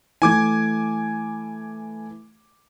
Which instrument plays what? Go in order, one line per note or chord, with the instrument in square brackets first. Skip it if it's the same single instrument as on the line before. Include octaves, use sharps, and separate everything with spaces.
[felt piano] E3 A3 [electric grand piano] G#5 D6 G#6